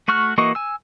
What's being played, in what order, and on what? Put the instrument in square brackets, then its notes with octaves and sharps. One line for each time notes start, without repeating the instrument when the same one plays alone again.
[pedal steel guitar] A3 F#4 C#6 F6 F#6
E3 A#3 F#4 D#5 C#6
G#5 E6